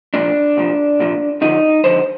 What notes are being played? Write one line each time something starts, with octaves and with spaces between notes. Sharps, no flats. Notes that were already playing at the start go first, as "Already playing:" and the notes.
C2 A#2 F3 D4
C2 A#2 F3
C2 A#2 F3
D#2 D3 F3 D#4
D#2 D3 F3 C5